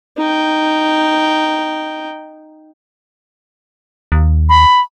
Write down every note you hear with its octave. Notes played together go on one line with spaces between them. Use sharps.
D#4 G5
D#2
B5